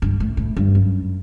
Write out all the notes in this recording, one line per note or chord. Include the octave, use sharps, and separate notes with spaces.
G2
A2
A2
G2
F#2